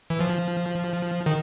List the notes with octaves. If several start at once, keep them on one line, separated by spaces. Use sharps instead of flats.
E3
F3
D#3